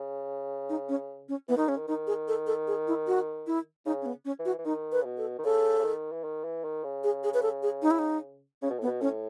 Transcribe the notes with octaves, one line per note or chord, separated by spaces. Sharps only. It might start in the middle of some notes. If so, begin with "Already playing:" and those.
Already playing: C#3
D#4
C#4
C#4
E3 B3
D#3 D#4
C#3 C#4
D#3
D#3 D#4
G#4
A4
A4
G#4
E4
F#4
E4
C#3 D#4
C#4
B3
C#4
E3
F#4
E3
D#3 D#4
B4
C#3
B2
A4
D#3
C#3 A4
C#3
D#3
E3
D#3
E3
D#3
C#3
G#4
G#4
B4
A4
G#4
D#4
E4
D#4
C#3 C#4
B2
A2 B3
B2
A2 C#4